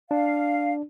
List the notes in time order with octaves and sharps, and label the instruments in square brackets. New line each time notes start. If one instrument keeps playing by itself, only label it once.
[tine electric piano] D4 [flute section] F5